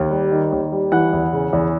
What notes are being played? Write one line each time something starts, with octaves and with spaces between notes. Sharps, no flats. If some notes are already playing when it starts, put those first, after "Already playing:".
Already playing: D#2
G3
D#3
D#2
G3
E3 F#5
E2
C#3
E2